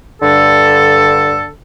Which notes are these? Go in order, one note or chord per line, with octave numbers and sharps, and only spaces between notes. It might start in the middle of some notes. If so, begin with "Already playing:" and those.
G2 D3 A4